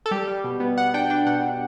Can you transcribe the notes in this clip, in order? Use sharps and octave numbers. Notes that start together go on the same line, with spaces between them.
A4
G3 G4
G3
B2
B3
B3 F#5
D4 G5
D4 G5
B2 F#5
D4